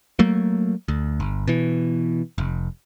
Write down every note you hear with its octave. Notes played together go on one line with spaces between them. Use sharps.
F#3 A3 A#3
D2
G1
B2 E3
F1